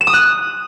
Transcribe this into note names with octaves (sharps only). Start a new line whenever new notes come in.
E7
D#6
F#6